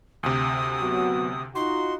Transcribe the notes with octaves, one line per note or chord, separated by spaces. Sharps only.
D2 C3 D#6
F#3 B3 F#4
D#4 F4 F#4 C6